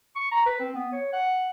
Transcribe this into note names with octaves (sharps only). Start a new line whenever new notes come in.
C#6
A#5
B4
C4
B3
C#5
F#5